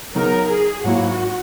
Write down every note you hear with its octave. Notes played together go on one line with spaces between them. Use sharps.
C#3 F#3 B3 D#4 A#4
G#4
G#2 F#3 A#3 E4 F#4